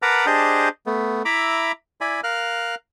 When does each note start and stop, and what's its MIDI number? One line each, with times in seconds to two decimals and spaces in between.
0.02 0.26 70
0.02 0.26 71
0.02 0.26 78
0.02 0.26 81
0.02 0.26 82
0.02 0.26 86
0.26 0.69 62
0.26 0.69 67
0.26 0.69 68
0.26 0.69 72
0.26 0.69 75
0.26 0.69 81
0.86 1.23 57
0.86 1.23 59
1.25 1.72 64
1.25 1.72 76
1.25 1.72 82
1.25 1.72 83
1.25 1.72 86
2.01 2.21 64
2.01 2.21 74
2.01 2.21 80
2.01 2.21 83
2.24 2.75 70
2.24 2.75 77
2.24 2.75 89
2.24 2.75 90